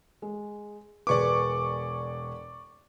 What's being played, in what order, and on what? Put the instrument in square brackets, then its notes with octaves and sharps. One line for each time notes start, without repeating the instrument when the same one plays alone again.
[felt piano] G#3
[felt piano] E1 G#4 B4 [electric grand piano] D5 C#6 D6